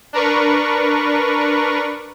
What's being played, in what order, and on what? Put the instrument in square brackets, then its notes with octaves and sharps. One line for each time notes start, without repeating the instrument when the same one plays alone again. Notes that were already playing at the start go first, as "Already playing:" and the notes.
[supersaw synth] D4 A#4 B4 C#6